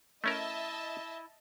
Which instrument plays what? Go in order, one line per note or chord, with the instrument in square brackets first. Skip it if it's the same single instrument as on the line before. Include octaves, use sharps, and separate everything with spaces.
[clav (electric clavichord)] A3 C#4 A#4 [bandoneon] E4 [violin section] D#5 E5 A5